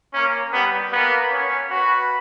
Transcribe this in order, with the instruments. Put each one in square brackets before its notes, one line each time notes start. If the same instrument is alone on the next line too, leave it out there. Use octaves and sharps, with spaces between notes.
[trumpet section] A#3 A#4 [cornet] C#4
[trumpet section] G3 G4 [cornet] B3
[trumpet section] A#3 A#4 [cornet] B3
[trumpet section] C#4 C#5
[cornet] F#4 [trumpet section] B4 B5